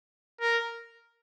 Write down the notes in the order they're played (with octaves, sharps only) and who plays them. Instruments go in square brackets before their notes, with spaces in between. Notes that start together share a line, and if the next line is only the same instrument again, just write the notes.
[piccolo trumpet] A#4